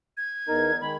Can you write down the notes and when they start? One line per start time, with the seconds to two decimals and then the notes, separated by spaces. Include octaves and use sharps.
0.17 G#6
0.48 E2 D#4 A#4
0.81 D#3 G#3 B5